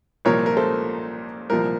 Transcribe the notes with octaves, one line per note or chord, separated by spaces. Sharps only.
C2 A#2 F3 A#4 C#5
A#4
A4 C5
C2 A#2 F3 A#4